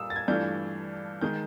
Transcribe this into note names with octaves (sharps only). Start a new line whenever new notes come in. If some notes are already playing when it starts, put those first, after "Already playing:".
Already playing: A#2 G3 A#3 D#6 E6
A6
G#6
G2 E3 A3 D4 F4 G6
D#3 G#3 G6